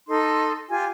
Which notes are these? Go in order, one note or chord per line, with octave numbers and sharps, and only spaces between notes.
D#4 A4 C6
F4 G4 G#5